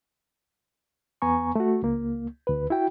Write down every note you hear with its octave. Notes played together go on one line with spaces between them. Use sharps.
E2 B3 G#5 A#5 C#6
A3 F#4
C#2 A#3
D2 B4
E4 F#4 G5